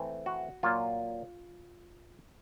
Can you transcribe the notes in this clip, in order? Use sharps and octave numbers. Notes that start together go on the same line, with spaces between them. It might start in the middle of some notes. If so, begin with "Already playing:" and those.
Already playing: E3 A3 C4
F#4
A#2 F#3 A#3 F4